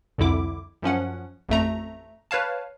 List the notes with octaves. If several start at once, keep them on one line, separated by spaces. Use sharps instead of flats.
C2 F2 D3 E4 D6
F#2 F3 C#4 F#5
A1 F2 A3 A#5
B4 C#5 F5 A5